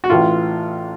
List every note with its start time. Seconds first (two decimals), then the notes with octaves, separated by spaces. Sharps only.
0.04 F#4
0.10 A1 A2 E3 F4